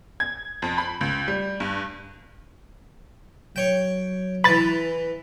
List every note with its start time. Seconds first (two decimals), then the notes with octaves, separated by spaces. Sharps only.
0.20 G#6
0.62 F2
0.78 B5
1.01 C#2
1.28 G3
1.60 G2
3.56 F#3 C#5 G5
4.44 E3 B4 B5 A6